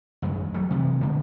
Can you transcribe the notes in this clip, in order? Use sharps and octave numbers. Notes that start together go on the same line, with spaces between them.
A1 F#2 D#3 G#3
F#3 G3 A3
C3 E3 F3
D#1 D3 G#3 A#3